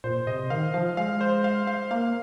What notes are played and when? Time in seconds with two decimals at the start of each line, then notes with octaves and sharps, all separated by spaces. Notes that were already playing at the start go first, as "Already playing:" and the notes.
0.04 A#2 C5
0.27 C3 D#5
0.50 D#3 F5
0.74 F3 F5
0.97 G#3 F5
1.21 C5
1.44 F5
1.67 F5
1.91 A#3 F5